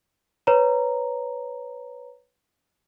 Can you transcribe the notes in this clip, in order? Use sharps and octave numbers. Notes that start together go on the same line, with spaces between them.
B4 C#5 A#5